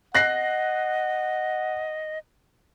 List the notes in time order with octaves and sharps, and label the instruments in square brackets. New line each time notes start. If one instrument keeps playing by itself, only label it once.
[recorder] D#5 [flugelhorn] F#5 [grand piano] F#6 A#6 C7